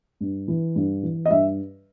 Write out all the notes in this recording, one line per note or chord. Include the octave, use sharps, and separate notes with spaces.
G2
E3
G2
E3
D#5
G2 E5